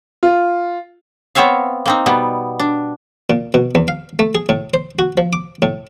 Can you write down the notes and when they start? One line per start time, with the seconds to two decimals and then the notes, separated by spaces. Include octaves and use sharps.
0.23 F4
1.35 B3 C4 C#5 E5 F5
1.86 A#3 C4 D#4
2.06 B2 G3 B3
2.60 D4
3.30 A#2
3.54 B2
3.75 E2
3.88 F5
4.19 A3
4.35 G#4
4.49 A2
4.74 C5
4.99 F#4
5.17 F3
5.33 D6
5.62 A2